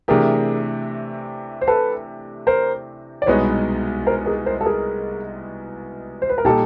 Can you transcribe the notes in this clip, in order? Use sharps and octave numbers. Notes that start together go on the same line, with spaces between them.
C3 E3 A3 D4 G4 G#4 A#4
C5
A4 B4
A#4 C5
D5
C2 B2 G#3 B3 D#4 B4 C#5
A#4 C5
G#4 A#4
A#4 C5
A4
G#4 A#4
C5
B4
A#4
A#2 G3 A#3 D#4 G4 A4